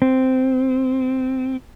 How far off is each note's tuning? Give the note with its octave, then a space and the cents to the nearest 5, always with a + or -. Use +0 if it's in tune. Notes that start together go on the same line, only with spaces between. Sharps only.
C4 -10